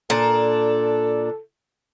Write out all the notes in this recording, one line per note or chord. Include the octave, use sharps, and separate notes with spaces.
A#2 D4 A4